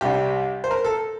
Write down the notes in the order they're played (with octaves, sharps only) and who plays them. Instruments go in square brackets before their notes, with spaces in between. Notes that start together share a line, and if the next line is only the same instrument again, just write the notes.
[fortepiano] C2 C3 G3 D4 G4
C5
A#4
A4